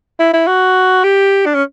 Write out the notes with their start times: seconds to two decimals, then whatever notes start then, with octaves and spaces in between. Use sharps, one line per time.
0.19 E4
0.33 E4
0.47 F#4
1.04 G4
1.46 D4
1.55 C#4